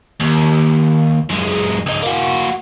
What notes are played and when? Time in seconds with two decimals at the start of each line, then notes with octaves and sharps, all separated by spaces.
0.21 D#2
1.30 F#2 G#3
1.87 C#2 D#4
2.02 A#3 F#4